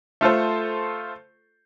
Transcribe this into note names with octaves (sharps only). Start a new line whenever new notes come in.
A3 F4 A4 C5